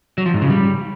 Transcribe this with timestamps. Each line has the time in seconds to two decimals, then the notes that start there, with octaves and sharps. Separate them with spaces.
0.18 F#3
0.26 F3
0.34 G#2
0.42 C#3
0.50 G3